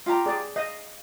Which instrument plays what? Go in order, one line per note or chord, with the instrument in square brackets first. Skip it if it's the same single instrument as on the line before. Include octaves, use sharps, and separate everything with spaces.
[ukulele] F4 G4 A#5
[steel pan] G#4 D5
[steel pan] D#5 [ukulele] F5